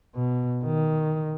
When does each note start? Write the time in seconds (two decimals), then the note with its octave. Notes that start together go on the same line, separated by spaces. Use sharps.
0.15 B2
0.64 D#3